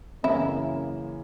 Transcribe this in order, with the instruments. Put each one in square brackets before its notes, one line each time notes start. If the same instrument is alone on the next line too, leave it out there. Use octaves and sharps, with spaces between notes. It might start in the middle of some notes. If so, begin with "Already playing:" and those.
[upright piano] F#2 C#3 E3 A#3 C#4 [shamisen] E4